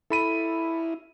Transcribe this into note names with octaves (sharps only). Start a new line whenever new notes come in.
E4 A4 B5 D#7